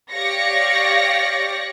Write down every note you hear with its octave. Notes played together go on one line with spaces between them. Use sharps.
G4 C#5 D5 F5 A#6 C#7